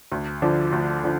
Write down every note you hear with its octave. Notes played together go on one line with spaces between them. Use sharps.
D2
D3 F3 D4
D2
D3 F3 D4